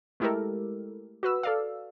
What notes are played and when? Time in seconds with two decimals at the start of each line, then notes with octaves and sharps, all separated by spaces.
0.20 G#3 A3 E4 G4 A4 A#4
1.23 F#4 B4 E6
1.43 A4 D5 F5